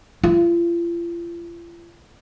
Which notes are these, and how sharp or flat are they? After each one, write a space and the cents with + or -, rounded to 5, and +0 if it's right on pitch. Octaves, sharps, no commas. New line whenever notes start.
F4 -40